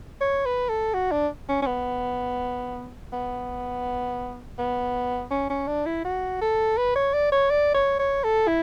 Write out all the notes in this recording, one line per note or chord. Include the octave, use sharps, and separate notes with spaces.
C#5
B4
A4
F#4
D4
C#4
C#4
B3
B3
B3
C#4
C#4
D4
E4
F#4
A4
B4
C#5
D5
C#5
D5
C#5
C#5
A4
E4